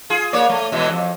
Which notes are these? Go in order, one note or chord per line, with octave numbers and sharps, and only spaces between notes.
F4 G#4
A#3 C#5 D5
A3
B2 E3 G#3
F2